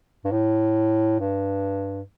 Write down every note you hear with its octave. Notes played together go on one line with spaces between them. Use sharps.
G2
A2
G2